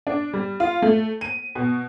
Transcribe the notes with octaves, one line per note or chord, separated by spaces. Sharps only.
D4
G3
F4
A3
D#7
B2